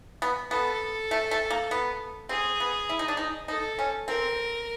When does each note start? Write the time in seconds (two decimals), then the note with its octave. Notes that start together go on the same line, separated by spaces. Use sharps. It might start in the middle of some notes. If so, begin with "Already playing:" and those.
0.22 B3
0.51 B3 A4
1.11 A3
1.31 A3
1.50 A#3
1.71 B3
2.29 C4 G#4
2.60 B3
2.90 E4
2.99 D#4
3.08 D4
3.17 D#4
3.48 D#4 A4
3.79 C#4
4.08 C4 A#4